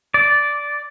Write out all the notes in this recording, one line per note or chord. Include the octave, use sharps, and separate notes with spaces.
D5